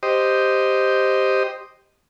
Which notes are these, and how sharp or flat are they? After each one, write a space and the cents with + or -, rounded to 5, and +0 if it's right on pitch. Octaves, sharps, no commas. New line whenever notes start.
G4 +0 C5 -5 D#5 +0